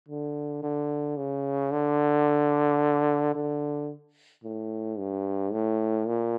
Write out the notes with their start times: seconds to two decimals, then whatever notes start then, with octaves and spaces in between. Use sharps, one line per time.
0.09 D3
0.63 D3
1.17 C#3
1.72 D3
3.35 D3
4.44 A2
4.99 G2
5.52 A2
6.07 A#2